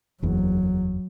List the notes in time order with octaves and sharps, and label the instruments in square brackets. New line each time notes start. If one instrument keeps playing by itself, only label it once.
[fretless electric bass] F#1 E2 [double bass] F#3